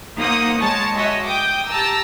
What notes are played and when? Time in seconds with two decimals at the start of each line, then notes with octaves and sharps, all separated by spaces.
0.17 A#3 D#4 C5 F#5 D#6
0.60 G#3 C#5 A5
0.97 F#4 C#5 D#5 E5
1.25 G5 D6 D#6
1.69 G4 A5 A#5 E6